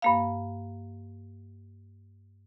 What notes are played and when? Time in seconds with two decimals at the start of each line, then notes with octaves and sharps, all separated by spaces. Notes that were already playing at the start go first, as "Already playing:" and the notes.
0.02 G2 A#3 F5